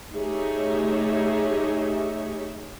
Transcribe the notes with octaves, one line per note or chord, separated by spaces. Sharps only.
A3 D#4 G4 G#4 C#5 E5